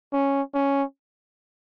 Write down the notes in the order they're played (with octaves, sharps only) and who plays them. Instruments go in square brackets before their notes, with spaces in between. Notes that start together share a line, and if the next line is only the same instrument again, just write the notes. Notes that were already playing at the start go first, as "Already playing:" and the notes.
[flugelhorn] C#4
C#4